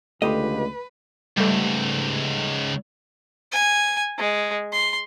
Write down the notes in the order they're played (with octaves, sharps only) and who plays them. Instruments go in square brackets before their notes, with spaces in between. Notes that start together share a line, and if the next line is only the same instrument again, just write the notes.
[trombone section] C#2 D3 [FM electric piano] A3 [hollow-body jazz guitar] F4 G4 D#5 [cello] B4
[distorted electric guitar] C#2 G#2 [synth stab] G3 A3
[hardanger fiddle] G#5
G#3
C6